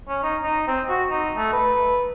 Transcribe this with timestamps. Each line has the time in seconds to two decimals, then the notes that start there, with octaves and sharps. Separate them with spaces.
0.08 C#4
0.23 D#4
0.43 D#4
0.67 C4
0.89 F#4
1.10 D#4
1.37 A3
1.53 B4